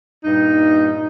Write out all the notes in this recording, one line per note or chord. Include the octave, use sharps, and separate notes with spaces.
G2 A#2 D#4